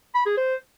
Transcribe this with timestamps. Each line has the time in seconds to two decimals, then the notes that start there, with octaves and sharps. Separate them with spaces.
0.15 B5
0.26 G#4
0.37 C5